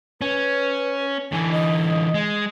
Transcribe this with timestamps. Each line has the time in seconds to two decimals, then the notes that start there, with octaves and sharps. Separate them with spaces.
0.21 C#4 B4
1.32 D3 E3 G#5
1.51 D#5
2.14 G#3